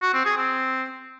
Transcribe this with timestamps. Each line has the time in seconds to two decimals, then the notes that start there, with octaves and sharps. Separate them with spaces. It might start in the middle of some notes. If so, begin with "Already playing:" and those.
0.02 F#4
0.14 C4
0.26 G#4
0.37 C4